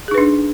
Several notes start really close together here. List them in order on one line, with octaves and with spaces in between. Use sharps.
G#4 D#4 B4 D4